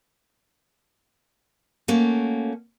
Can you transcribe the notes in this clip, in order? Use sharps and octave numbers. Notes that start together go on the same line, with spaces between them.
A3 A#3 C#4 F#4